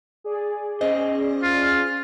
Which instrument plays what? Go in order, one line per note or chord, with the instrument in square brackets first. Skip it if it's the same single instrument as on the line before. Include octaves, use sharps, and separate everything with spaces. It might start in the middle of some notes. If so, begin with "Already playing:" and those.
[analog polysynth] G#4 D5
[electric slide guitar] C#4 C5 [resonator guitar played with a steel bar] D#5
[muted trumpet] F4